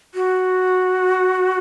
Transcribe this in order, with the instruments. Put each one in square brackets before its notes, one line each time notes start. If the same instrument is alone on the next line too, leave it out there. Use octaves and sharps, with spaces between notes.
[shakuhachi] F#4